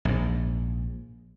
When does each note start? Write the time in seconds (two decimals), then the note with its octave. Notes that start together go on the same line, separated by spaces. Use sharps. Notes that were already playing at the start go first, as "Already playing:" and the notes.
0.05 A#1 G#2